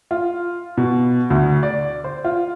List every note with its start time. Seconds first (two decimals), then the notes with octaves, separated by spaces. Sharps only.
0.11 F4
0.77 B2
1.30 D2
1.63 D5
2.04 C5
2.24 F4